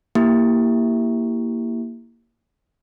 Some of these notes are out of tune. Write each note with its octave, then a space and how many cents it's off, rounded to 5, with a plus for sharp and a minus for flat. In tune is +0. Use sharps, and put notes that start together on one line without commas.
A#3 +0 E4 +0 G4 +0